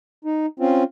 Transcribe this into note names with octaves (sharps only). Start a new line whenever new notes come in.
D#4
C4 C#4 F4